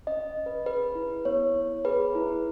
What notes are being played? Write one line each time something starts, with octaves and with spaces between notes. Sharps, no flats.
C#4 D#5
C#4
B4
G#4 B4
E4
B3 C#5
B3
G#4 B4
E4